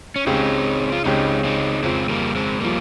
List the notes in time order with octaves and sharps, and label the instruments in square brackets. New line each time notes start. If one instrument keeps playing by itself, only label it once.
[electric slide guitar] C#4
[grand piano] C#2 C#3 G#3 C#4 G4 [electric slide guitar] C4 D#4
[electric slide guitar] F4
[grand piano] C#2 C#3 G#3 C#4 G4 [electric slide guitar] C4 D#4
[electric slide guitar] C4 D#4
[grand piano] F2 C#3 F3 [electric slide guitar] G#3 C4
[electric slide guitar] G3 A#3
G#3 C4
[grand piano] C#3 F3 [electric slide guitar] G3 A#3